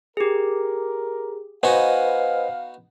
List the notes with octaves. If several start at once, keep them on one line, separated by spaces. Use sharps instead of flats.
G4 G#4 A#4
B3 D#4 F#4 B4 C5 D#5 F5 G#5